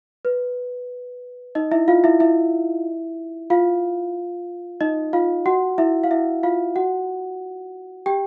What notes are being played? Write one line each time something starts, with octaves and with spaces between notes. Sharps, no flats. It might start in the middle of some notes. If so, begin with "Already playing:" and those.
B4
D#4 D#5
E4 E5
F4 F5
E4 E5
E4 E5
F4 F5
D#4 D#5
F4 F5
F#4 F#5
E4 E5
F5
E4 E5
F4 F5
F#4 F#5
G4 G5